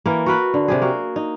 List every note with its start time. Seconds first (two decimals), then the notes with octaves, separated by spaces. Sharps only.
0.06 E3 A#3
0.26 F#4 A#4 B4
0.54 D3
0.68 C3 G4 G#4
0.82 A#3 F#4
1.16 D#4